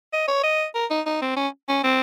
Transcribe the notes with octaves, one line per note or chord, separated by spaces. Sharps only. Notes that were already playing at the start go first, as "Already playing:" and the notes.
D#5
C#5
D#5
A#4
D#4
D#4
C4
C#4
C#4
C4